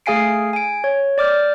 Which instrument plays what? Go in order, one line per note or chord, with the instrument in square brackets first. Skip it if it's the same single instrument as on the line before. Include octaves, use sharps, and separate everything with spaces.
[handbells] A3 G#4 F5 G#5 C7 D7
G#5 D7
C#5
D5 D6 F6 G6